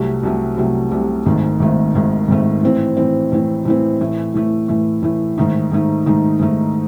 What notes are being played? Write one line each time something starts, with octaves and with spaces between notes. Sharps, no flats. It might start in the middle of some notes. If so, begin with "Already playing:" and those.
Already playing: C2 C3 F#3 A3
C2 C3 F#3 A3
C2 C3 F#3 A3
C2 C3 F#3 A3
G#1 G#2 D#3 A3
G#1 G#2 D#3 A3
G#1 G#2 D#3 A3
G#1 G#2 D#3 A3
A2 E3 C4
A2 E3 C4
A2 E3 C4
A2 E3 C4
A2 E3 A3
A2 E3 A3
A2 E3 A3
A2 E3 A3
G#2 D#3 A3 D#4
G#2 D#3 A3 D#4
G#2 D#3 A3 D#4
G#2 D#3 A3 D#4